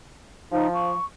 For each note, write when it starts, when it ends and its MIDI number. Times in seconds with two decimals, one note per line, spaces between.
0.52 0.93 53
0.52 0.68 63
0.74 1.05 85